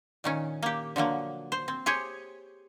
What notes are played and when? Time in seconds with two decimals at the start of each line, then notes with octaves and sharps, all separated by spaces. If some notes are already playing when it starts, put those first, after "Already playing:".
0.24 A#2 D#3 C#4
0.63 A#3 G4
0.96 D3 F3 F#3 A#3
1.52 C5
1.68 C4
1.86 G4 G#4 C5 C#5